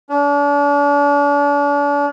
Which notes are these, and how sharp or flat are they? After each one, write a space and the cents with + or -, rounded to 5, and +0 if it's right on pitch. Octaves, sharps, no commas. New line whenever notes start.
D4 -40